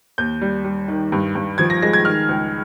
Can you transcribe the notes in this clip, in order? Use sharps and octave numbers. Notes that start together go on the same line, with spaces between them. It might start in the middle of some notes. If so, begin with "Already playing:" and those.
D#2 G6
G3
G3
D#3
G2
G2
F3 G#6
A#6
G#3 A#6
G#6
D#3 F6
C#2